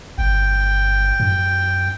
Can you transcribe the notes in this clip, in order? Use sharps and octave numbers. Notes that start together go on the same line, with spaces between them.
G1 G5
F#2